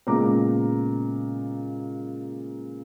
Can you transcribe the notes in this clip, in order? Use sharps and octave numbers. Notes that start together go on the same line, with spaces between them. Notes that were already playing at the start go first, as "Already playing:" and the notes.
A#2 C#3 G#3 B3 A#5 D6